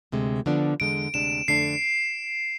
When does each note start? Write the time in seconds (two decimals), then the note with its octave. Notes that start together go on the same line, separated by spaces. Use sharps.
0.12 D2 C3 G#3
0.46 D3 F3 B3 D4
0.80 E2 D3 G#3 D7
1.14 D2 C3 G#3 D4 E7
1.48 F2 D3 A3 D4 C7